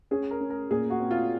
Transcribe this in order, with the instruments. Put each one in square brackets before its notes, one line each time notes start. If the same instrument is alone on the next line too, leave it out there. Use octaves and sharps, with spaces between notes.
[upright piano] C#4 [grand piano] G#4
[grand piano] A#4
[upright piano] C#4
[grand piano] A#4
[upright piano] A#2 [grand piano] G#4
[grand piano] F#4
[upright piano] C4
[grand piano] F4